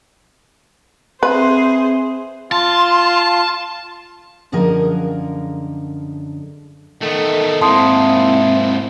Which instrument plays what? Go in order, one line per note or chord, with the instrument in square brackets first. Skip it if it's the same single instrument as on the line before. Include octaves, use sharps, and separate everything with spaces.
[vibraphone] C4 E5 [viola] G#4 C5 [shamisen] B4
[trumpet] F4 [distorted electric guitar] A5 [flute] C6
[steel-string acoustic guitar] F#2 D3 F3 G#4 A#4 D#5
[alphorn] D#3 [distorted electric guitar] A3 B3 [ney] A4
[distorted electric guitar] G#2 A#3 [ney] C4 [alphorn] E4 [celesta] A5 C6 D#6